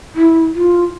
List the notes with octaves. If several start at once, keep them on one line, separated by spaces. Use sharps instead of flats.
E4
F4